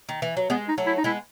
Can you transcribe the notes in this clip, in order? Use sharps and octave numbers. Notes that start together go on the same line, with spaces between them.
D#3
E3
F#3
G#3 B3
D#4
F#3 A3
E4
D#4
G#3 B3 E4